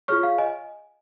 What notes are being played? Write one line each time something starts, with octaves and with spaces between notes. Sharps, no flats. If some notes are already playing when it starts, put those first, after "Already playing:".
F4 G#4 C#5 C#6 F6
F5
D#5 G#5